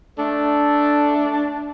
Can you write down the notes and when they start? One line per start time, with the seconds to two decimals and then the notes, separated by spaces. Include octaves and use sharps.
0.18 A3 D4 A4